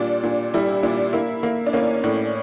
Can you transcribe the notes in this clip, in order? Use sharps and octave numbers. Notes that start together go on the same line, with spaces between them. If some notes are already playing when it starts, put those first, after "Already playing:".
Already playing: A#2 G3 D4
A#2
G3 E4
A#2 D4
A#3 E4
A#3
D4
A#3 C#4
A2